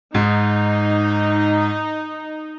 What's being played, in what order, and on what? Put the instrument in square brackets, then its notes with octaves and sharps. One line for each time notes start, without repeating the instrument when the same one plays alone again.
[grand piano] G#2 [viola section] D#4